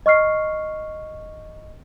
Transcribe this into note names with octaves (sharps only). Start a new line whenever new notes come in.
D#5 C#6 F6 C7